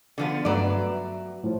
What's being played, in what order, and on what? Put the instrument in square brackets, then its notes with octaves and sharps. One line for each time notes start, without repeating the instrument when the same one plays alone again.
[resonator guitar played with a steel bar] D3 F3 B3
[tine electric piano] G2 A3 B4 [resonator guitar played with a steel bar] F#3 D5
[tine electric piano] E5
A2 F3